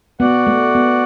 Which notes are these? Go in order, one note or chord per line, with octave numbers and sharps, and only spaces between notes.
B3 F#4 D5 F#5
A3
B3